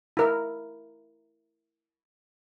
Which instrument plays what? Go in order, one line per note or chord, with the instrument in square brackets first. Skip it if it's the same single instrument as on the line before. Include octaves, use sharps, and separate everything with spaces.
[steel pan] E4 A#4